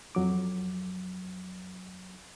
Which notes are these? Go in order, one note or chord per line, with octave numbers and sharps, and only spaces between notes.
F2 F#3 D6